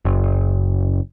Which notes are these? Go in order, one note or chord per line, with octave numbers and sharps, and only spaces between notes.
F#1